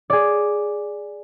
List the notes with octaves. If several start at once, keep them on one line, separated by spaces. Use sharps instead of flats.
G#4 D5